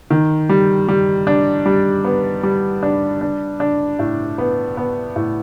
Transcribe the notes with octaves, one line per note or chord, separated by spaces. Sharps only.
D#3
G3
G3
D4
G3
B3
G3
D4
D4
D4
A2
B3
B3
A2